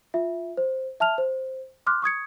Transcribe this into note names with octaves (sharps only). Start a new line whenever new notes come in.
F4 E5
C5
E5 A5 F6 F7
C5
C6 D6 F6 F#6
C#6 D#6 G#6 C#7